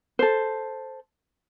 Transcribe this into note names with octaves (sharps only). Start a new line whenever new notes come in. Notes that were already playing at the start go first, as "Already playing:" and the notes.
A4 C5